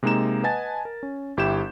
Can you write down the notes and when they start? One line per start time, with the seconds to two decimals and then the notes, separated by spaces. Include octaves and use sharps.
0.03 C3 G#3 A#3 D#4 A#5 E7
0.43 B4 D#5 F#5 G#5 A5 A6
0.85 A#4
1.03 C#4
1.37 G1 E4 G4 E5 G6 E7